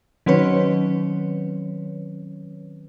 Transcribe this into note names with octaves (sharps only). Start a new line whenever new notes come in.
D#3 F#3 C4 C#4 B4 C#5